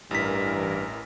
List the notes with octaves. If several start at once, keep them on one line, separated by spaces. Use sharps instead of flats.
A1 G2 E3 A#4 B6